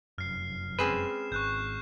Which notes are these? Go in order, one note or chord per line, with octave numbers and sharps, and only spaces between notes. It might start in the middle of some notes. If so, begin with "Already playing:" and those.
F1 F#2 F6 C7
G#3 C4 C#4 G#4 B4 E7
G#1 C#6 F#6 G6